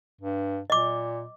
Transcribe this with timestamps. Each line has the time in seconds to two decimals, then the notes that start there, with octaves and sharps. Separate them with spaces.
0.21 G2
0.70 A#2 D#5 D6